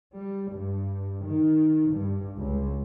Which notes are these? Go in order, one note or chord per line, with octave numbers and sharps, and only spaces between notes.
G3
G2
D#3
G2
C#2